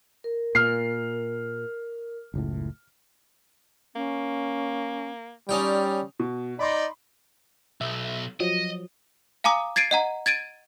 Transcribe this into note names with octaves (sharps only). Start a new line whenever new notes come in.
A#4
A#2 F6 C7
F#1 C#2 A2
A#3 C#4
G3 C#4 D#4 D5 G5
B2
D#4 D5 D#5 B5 C6
B1 E5
F3 F#3 D#5
F5 G#5 A#5 D6 D#6
G#6 A6 C7 D7 D#7
D#5 F#5 A#5
G#6 A6 D7 D#7